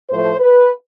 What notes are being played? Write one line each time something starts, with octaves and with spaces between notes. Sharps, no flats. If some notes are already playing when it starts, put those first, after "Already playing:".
A2 F3 A3 C5
B4